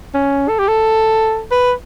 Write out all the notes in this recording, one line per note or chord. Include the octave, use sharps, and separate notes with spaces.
C#4
A4
G4
A4
B4